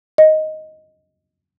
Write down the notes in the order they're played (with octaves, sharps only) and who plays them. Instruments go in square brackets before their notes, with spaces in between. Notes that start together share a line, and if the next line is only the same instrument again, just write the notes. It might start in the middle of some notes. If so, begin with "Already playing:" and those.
[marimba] D#5